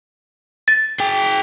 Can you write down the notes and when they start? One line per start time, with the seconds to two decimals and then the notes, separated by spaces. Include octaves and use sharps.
0.68 A6
1.00 G#4 G5